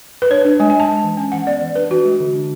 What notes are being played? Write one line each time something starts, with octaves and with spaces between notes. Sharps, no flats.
B4
D4 C#5
D4
G#3 G#5
G#5
G#3 A5
G#3
E3
C#4 G#5
E3 F#5
B3 D5
E3
D4 B4
E3 F#4
G#3
D3
D4